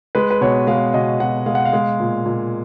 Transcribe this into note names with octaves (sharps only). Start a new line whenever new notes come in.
G#3 B4
B4
B2 C#5
G#3 F5
B2 D#5
B2 F#5
G#3 F5
F#5
F5
G#3
A#2
A#2